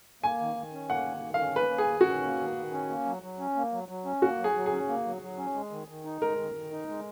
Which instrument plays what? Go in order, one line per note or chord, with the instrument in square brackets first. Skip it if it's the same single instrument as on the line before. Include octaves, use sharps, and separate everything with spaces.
[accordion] A#3 [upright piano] G#5
[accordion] D#3
D#3
C#4
[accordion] A#3 [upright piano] F#5
[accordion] D#3
D#3
[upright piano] F5
[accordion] C#4
[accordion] A#3 [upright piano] B4
[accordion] D#3
[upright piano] G#4
[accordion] D#3
[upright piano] F#4
[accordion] C#4
A#3
D#3
D#3
C#4
A#3
F#3
F#3
C#4
A#3
F#3
F#3
C#4
[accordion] A#3 [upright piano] F#4
[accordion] F#3
[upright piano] G#4
[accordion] F#3
[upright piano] G#4
[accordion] C#4
A#3
F#3
F#3
C#4
G#3
D#3
D#3
D#4
[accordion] G#3 [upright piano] A#4
[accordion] D#3
D#3
D#4
G#3